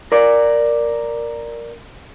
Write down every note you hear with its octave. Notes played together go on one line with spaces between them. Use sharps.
A#4 D5